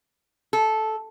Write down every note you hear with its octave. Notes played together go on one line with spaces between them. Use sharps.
A4